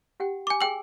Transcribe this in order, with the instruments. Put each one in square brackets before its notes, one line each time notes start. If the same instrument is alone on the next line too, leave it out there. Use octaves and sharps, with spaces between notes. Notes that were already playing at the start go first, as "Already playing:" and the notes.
[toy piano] G4 F#5 G5
[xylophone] G#5 D6
[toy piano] G#4 G#5 E6 [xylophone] G5 F#7